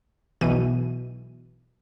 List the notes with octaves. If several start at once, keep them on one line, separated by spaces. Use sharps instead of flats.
B1 B2 E3 D#7